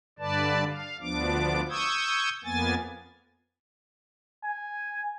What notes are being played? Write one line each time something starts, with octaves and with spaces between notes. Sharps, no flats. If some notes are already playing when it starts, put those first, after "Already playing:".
G2 D3 B4 D5 A5
F5
D2 F3 B3 D4 D6
C#6 D#6 E6 G6 G#6
F2 A#3 B3 G#5 A6
G#5